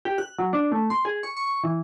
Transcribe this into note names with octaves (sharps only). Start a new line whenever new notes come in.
G4
F#6
F#3
D4
A3
C6
G#4
C#6
C#6
E3